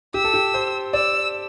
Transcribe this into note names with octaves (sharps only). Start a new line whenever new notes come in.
G4 E6
A4
G4
C5
D5 E6